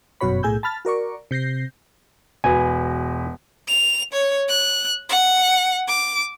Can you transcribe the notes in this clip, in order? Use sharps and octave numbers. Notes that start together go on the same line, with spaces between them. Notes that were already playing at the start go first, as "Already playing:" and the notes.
G1 F#2 B2 F#4 C#5 B5
B1 A2 G#4 G#5 E6 G6
A5 B5 F6 A6
F#4 A#4 D5 C#6
C3 G6 A#6 C7
E1 F#4 B4 G#5
F7
C#5
F#6
F#5
D6